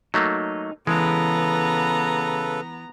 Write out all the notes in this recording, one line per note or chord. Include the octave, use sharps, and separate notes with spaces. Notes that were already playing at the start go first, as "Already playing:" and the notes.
F#3 A3 A#3 D#4
C#3 E3 G#3 B3 A4 B4 A#5